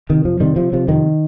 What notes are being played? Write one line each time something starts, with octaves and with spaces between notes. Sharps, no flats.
C3 D#3
F2 F3
C3 D#3 G3
C3 F3
C3 F3
F2 D#3